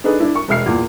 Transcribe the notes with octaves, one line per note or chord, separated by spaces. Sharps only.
D4 D#4 G#4 A4 B4
D4 E4
C#6
E1 G#3 E5 F6 C7
E2 A#2